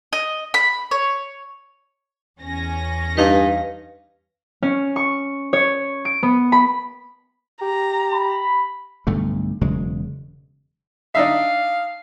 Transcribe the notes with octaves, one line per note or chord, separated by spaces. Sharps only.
D#5
B5
C#5
E2 C#4 A#6
G2 D#4 B4 F5
C#4
C#6
C#5
D7
B3
B5
G4 A#5
B5
B1 G2 D3 A3
E1 C#3 F#3 G#3
D4 D#4 E5 F5